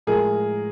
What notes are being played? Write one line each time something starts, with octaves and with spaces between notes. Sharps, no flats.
A2 F3 G#3 G#4 A#4